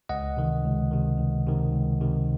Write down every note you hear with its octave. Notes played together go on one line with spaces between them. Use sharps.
C#2 D#5 F#5
C3 D#3
C#2
C3 D#3
C#2
C3 D#3
C#2
C3 D#3